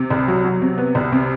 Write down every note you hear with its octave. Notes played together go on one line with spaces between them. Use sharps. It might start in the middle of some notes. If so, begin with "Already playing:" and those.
Already playing: C3
C2
F#3
F#3
C3
B3
C2
C3